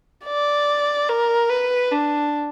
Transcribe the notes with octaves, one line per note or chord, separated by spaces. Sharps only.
D5
A#4
B4
D4